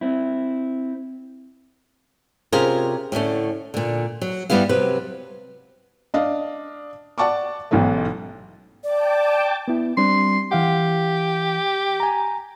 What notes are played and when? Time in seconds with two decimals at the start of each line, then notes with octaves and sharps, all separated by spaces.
0.01 C4 E4
2.52 C3 C#4 F4 G#4 A#4
3.12 A2 D3 A3 C#4
3.74 A#2 D3
4.22 F#3
4.50 G2 D#3 G3 B3 E4 F5
4.69 C3 F#3 B4
6.14 D4 D#5 F5
7.18 D5 F#5 A5 C#6 D6
7.71 A1 G#2 B2 F#3 A3
8.84 D5 G5 A5 D6
9.68 B3 E4
9.97 G3 C4 D4 C6
10.52 E3 G4 F5 F#5
12.00 G#5 A#5